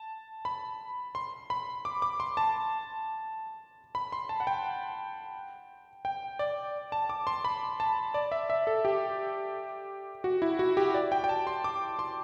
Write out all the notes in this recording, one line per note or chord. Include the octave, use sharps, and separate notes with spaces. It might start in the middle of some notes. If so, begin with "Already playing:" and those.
Already playing: A5
B5
C6
B5
D6
D6
C6
A5
B5
C6
A5
F#5
G5
G5
D5
A5
D6
C6
B5
A5
D5
E5
E5
A4
G4
F#4
E4
F#4
G4
D5
G5
G5
A5
C6
D6
C6